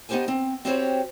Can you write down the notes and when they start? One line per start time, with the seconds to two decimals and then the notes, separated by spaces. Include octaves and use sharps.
0.09 B3 D#4 E4 G4 C5 G#5
0.28 C4
0.65 C4 E4 F#4 G4 C5 C#5